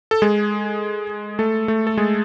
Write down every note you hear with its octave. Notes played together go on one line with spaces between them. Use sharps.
A4
G#3 G#4
A3 A4
A3 A4
A4
G#3 G#4